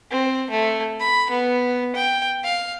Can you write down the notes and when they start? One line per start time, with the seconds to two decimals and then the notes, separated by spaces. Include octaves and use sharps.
0.11 C4
0.50 A3
1.00 B5
1.31 B3
1.96 G5
2.44 F5